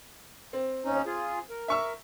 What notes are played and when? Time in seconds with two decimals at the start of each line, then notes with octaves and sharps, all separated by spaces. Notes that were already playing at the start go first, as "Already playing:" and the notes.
0.53 C4
0.85 D#2 C#4 D#4
1.06 F4 G#4
1.50 A#4
1.68 E5 C#6 E6